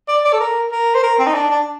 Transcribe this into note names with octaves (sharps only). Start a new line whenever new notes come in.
D5
D5
A4
A#4
A#4
C5
A#4
C4
D#4
D4
D4